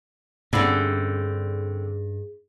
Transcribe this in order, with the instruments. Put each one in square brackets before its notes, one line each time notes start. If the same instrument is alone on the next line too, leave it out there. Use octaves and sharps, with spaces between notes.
[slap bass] G2 [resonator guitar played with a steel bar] D3 C4 [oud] C#4 E4 [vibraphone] G#4